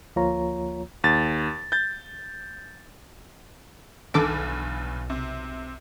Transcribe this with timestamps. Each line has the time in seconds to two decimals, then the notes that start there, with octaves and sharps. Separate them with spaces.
0.16 D2 F3 A#3 F4 C#5 A#5
1.04 D#2 A6
1.72 G6 A6
4.14 B1 E2 G2 D3 D#3 A4 D6
5.10 C3